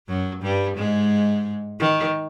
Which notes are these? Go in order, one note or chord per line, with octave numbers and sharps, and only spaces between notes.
F#2 F#3
G2 G3
G#2 G#3
D#3